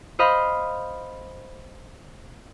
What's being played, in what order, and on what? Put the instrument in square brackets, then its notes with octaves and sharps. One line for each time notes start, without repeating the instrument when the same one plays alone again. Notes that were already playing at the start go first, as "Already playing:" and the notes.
[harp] C5 D#5 F5 B5 F6